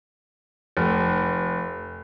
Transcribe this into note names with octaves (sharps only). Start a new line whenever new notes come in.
F1